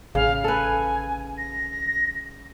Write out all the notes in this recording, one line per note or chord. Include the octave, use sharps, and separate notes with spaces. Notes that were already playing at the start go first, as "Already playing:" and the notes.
A1 C#3 F5
A4 B4 G#5
A#6